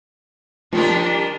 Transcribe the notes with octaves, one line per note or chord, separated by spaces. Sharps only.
D#3 F3 G3 D4 A#4